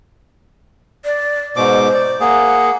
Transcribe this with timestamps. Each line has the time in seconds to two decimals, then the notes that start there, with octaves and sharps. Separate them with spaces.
1.05 D5
1.57 G#2 B2 C5 D6
1.94 D5
2.20 A#3 G#4 F#5